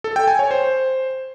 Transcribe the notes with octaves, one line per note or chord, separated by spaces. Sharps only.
A4
G5
G#5
C#5
C5